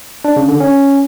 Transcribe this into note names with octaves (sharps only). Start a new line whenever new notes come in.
D4
C#3
D3
C#4